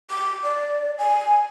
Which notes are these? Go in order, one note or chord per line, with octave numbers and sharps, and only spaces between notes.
D6
D5
G#5